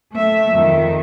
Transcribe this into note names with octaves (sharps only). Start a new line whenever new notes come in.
A3 E5
F2 D#3